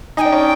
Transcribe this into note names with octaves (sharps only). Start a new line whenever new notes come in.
D#4 G#5
D4 G5
C#4 D#4